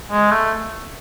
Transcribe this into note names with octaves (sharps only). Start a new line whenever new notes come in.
G#3
A3